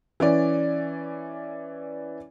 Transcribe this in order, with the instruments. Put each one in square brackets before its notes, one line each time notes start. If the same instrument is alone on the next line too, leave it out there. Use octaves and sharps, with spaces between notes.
[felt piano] E3 C#4 D5